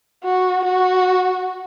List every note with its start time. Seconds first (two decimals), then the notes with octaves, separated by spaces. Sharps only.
0.25 F#4
0.65 F#4